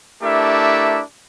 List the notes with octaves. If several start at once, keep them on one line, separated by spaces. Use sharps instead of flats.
A3 D4 E4 G4 A#4 E5